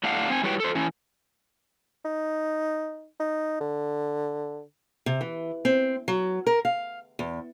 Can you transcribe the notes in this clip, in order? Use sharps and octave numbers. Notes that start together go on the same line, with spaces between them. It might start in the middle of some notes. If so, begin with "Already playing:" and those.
A2 D4 F5 F#5
C4 G#5
G3 E4 F#4 B4 C#5 G5
A4 C5
E3 C#4
D#4
D#4
D3
C3
E3
C4
F#3
A#4
F5
E2